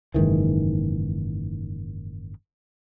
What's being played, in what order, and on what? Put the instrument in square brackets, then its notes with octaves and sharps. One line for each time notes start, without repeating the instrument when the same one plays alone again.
[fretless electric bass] F#1 G#2 D#3 E3